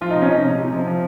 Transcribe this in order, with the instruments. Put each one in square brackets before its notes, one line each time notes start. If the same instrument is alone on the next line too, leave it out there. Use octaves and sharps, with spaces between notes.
[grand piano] F3 F4
C3 D#4
C#4
F3 D#4
C3
C3
F3
F3